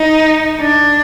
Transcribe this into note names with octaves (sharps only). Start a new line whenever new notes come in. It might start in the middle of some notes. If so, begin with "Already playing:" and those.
Already playing: D#4
D4